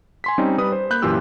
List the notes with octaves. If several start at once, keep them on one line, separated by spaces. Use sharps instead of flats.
G#5 C6 B6
G3 C4 C#4 D#4
G3 B4 B5 D#6
C5
A#3 B5 F#6 G6
F#2 A#2 E3 F4 G4 E6